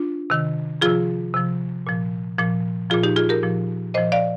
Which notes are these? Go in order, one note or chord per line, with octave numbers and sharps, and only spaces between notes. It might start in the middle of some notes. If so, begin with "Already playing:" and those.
Already playing: D4 F4
C3 D#3
C3 F3 F4 G#4
C3 F3
A#2 F3
A#2 F3
A#2 F3 F4 G#4
D#4 G4
F4 G#4
G4 A#4
A#2 F3
A#2 F3 C5 D#5
D5 F5